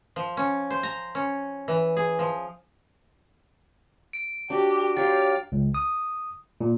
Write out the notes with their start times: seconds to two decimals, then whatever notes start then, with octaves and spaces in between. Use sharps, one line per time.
0.16 F3
0.37 C#4
0.70 C5
0.83 A#5
1.15 C#4
1.68 E3
1.97 G#4
2.19 F3
4.13 D7
4.50 D4 F#4 G4
4.97 F#3 G4 F5 G5 C6 A6
5.52 C#2
5.74 D#6
6.61 A#2